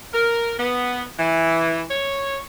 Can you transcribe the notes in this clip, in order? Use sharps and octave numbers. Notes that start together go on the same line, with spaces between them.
A#4
B3
E3
C#5